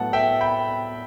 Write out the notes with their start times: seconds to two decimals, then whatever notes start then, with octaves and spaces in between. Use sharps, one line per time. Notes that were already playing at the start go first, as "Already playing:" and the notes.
Already playing: A2 F#3 B3 F#5 A5
0.13 E5 G5
0.41 G5 B5